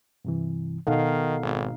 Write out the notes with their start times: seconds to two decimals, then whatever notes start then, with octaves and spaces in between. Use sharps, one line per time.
0.25 G2 C3 E3
0.87 B2 D#3 D#4 A4 F5 F#5
1.42 G#1